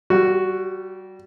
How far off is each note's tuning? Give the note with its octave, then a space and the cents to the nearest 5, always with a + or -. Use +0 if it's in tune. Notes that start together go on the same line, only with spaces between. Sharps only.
G3 -25 F#4 +0